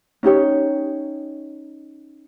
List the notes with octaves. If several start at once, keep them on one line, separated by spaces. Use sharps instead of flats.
C#4 D#4 G4 C#5